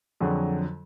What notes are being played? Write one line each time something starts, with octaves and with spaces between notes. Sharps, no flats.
F2 D3 F#3 F#4 G#4